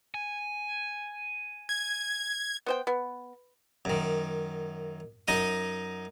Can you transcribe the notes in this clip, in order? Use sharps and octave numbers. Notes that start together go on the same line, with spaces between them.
G#5
G#6
B3 C5 G5
B3
F#2 D#3
F#2 D#4 D#5 D#6